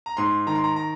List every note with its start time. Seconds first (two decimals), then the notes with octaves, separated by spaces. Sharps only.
0.06 A#5
0.17 G#2 C6
0.47 D#3 A#5
0.55 C6
0.64 A#5
0.76 A#5